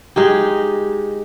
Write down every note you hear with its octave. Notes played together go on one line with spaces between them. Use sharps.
G#3 D#4 G4